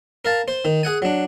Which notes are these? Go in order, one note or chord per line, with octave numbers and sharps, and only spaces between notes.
A#4 F5 A5
C5
D#3
G#4 F#5 G#5
F#3 D4